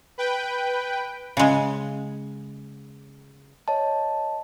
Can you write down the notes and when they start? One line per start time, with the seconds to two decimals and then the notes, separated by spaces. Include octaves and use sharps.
0.18 B4 G5
1.37 C#3 G#3
3.68 C#5 D#5 A5